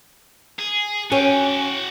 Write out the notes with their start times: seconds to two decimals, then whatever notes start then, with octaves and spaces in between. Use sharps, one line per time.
0.59 G#4
1.12 C#4 F#4 G5